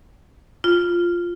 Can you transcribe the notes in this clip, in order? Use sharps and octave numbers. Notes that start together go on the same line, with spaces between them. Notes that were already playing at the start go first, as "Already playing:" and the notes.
F4